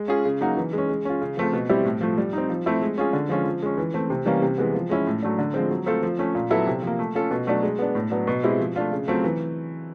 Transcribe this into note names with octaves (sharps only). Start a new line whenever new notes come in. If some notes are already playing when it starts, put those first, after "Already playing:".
Already playing: G#3
C#4 F4 G#4
C#3
F#3 A#3 D#4 F#4
E3
G#3 C#4
G#3
C#4 F4
C#3
F3 A3 C4 F4
B2
G3 C4 E4 G4
A2
F3 A3
G3
C4 D#4
F3
A3 C4 E4
G#3
C#4 F4 G#4
D3
F3 G#3 C#4 F4
F3
G#3 C#4
E3
A3 C4
C3
E3 G3 A#3 C#4
C3
E3 G#3 B3
F3
G#3 C#4 E4
A2
F#3 A3 D4
D3
F3 G#3 C4
F#3
A3 C4 F4 A4
F3
A3 C#4
A#2
F#3 B3 E4 A4
C3
F3 A#3
A3
C#4 F4 A4
B2
F#3 A3 D4 F#4
G#3
B3 D4
A2
F#3 B3 D4
B2
G#3 C4 E4 G4
F3
A3 D4 F4
C#3
F#3 A3 C4 F4
E3